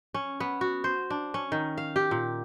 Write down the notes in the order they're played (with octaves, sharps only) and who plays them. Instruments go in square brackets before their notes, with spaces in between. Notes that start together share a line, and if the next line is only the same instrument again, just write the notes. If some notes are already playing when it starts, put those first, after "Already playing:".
[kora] C#4
B3
F#4
C5
D4
C#4
D#3
F5
G4
A#2